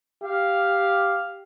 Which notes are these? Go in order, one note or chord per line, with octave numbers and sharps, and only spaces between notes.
G4 F5